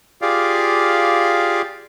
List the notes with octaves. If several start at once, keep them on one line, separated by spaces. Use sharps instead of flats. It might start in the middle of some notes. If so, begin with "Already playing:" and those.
F4 G4 G#4 D5 F5